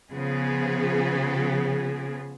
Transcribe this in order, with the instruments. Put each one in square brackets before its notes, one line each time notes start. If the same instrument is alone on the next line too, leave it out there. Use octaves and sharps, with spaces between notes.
[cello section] C#3 F3 B3 G#4